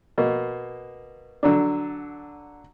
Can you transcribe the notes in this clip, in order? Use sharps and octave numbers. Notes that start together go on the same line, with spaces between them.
B2 A#3
D3 F#3 D4